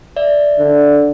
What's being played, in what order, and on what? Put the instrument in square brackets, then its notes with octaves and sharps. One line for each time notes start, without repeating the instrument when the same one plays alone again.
[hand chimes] D5 E5
[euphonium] D3